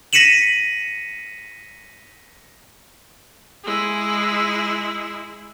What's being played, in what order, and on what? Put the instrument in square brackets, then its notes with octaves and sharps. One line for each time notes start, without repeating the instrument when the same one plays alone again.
[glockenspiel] A#6 B6 C#7 D#7 E7 F#7
[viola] G#3 E4